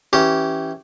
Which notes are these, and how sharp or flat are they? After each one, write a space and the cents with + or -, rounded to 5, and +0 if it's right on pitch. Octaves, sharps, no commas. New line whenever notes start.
E3 +0 C#4 +0 G4 -15